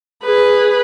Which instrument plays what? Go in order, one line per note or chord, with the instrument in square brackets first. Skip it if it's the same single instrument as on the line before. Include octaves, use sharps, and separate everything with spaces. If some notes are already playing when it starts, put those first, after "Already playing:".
[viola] G#4 B4